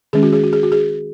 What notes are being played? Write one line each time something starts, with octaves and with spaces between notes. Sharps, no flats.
D#3 G#3 C#4 G#4
F#4
G#4
F#4
G#4
F#4
G#4